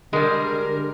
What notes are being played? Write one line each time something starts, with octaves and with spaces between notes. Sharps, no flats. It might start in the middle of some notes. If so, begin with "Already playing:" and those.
D3 G3 G#3 A#4